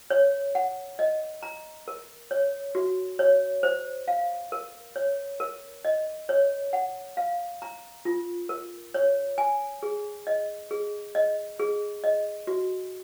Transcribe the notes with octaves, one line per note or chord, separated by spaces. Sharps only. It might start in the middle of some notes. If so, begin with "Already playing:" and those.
C#5
F#5
D#5
A#5
A#4
C#5
F#4
C#5
C5
F5
A#4
C#5
A#4
D#5
C#5
F#5
F5
A#5
F4
A#4
C#5
G#5
G#4
D#5
G#4
D#5
G#4
D#5
F#4